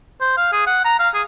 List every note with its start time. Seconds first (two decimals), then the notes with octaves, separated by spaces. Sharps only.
0.21 C5
0.37 F5
0.53 G#4
0.67 F#5
0.85 A#5
0.99 F5
1.14 G#4